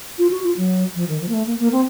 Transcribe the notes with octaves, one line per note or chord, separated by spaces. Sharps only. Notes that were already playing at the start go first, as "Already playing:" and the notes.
F4
F#4
F4
F#3
F3
D#3
F3
A#3
A3
A#3
A#3
C4